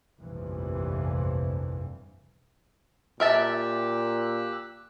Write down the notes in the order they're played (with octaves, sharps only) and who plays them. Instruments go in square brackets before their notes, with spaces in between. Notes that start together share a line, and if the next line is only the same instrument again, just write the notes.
[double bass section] F1 A#1 G2 A#2 E3 F3
[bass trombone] A#2 [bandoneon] G4 E6 F#6 [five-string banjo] A#4 E5 A5